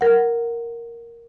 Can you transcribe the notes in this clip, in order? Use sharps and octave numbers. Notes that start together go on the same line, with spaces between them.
A#4 F#5